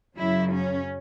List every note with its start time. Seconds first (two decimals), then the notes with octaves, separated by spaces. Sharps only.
0.16 F#2 C#3 F#3 E4
0.53 C#4